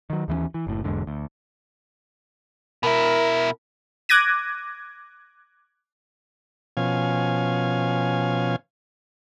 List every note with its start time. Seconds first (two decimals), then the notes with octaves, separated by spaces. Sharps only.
0.10 D#3 F#3
0.28 D#2 E3 A3 C#4
0.54 E3
0.67 F#1 A2
0.84 E1 E2 G#2 D3
1.07 D2
2.83 B2 E4 A#4
4.09 D6 F#6 G#6 A#6 D#7
6.77 B2 F3 C#4 F5 G#5